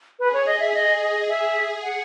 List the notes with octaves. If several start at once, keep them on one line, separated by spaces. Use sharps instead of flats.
G#4 B4
C#5
D#5
E5
G#4 D#5
D#5
G#4 E5
F#5